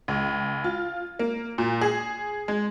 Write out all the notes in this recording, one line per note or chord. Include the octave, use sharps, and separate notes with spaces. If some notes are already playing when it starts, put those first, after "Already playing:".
C#2
F4
A#3
A#2
G#4
G#3